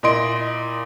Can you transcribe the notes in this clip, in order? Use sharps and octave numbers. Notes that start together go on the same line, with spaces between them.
A#2 E4 D#5 C6 D7